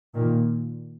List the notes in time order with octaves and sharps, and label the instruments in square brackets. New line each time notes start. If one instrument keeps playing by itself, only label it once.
[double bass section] A#2 D#3